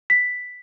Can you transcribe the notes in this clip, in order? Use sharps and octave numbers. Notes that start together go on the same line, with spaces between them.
B6